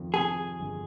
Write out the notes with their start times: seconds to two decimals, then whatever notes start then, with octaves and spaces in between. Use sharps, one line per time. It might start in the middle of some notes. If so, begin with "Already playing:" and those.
Already playing: F2 D#3
0.14 C3 G#4
0.60 G1